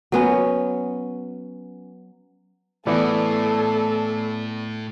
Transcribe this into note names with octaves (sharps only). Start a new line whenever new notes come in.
F#3 B3 C#4
A2 E3 B3 A4 D5